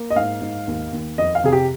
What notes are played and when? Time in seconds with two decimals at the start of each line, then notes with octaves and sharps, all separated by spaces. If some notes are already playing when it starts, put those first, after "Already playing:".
Already playing: A#3
0.10 D#5
0.16 G#2 F5
0.42 G#2
0.67 D#2
0.93 D#2
1.18 F2 D#5
1.35 F5
1.44 C3 G#4
1.52 G4